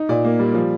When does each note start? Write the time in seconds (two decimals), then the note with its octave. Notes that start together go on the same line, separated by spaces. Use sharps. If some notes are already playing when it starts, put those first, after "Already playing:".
Already playing: D#4
0.09 A#2 D5
0.24 A#3
0.39 G3
0.54 F3